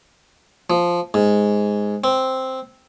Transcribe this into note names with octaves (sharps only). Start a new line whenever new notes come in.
F3
G#2
C4